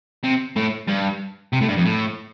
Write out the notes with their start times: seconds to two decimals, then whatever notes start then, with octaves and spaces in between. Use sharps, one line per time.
0.24 C3
0.56 A2
0.88 G2
1.53 C3
1.61 A2
1.68 G2
1.77 F2
1.85 A2